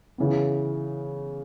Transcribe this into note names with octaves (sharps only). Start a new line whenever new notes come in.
C#3 E3 B3